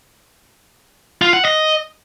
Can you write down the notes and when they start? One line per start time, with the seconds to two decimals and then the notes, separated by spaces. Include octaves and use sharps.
1.22 F4
1.33 F#5
1.45 D#5